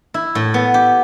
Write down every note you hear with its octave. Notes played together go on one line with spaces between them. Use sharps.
E4
A2
B3
G4